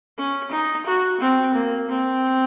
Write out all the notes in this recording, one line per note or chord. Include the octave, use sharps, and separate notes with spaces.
C#4
D#4
F#4
C4
A#3
C4